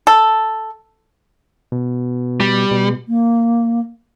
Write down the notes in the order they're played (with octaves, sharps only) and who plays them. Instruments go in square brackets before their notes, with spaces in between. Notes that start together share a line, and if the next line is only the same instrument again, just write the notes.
[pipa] A4
[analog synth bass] B2
[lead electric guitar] G3
[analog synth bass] B2
[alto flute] A#3